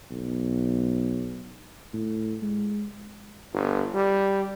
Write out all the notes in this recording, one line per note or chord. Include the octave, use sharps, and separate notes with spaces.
B1
A2
G#3
G1
G3